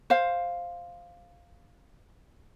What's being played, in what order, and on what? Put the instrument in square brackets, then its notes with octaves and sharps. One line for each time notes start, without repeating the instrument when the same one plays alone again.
[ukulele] C5 F5